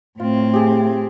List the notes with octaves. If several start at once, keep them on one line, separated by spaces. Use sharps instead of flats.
A2 A3 C4 F4
G4 G#4